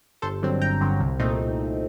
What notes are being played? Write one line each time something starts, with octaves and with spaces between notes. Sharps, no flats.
G1 A4 C5
G2 D3 F#3 C4
G1 G5 A#5
G2 D3 F#3 C4
C2
A#2 A3 C4 D#4